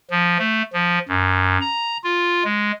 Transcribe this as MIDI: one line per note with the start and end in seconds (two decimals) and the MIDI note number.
0.10 0.37 53
0.38 0.62 57
0.73 0.98 53
1.09 1.58 42
1.61 1.97 82
2.04 2.44 65
2.44 2.72 56